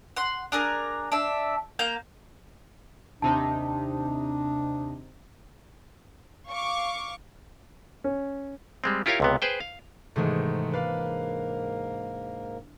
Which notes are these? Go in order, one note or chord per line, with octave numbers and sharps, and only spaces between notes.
F#5 C6
D4 G#4 A#4
D4 E5
A#3 F5 G6
D#2 C3 D4 D#4 A5
F5 C#6 D6
C#4
G3 G#3 C4
E4 F4 G4 A#4 C#5 F5
C#2 C3 B3
G#4 B4 C5 G5
F5
G#2 C3 D#3 E3 G#3 A3 G#4
G#2 A#3 D4 A#4 B4 F5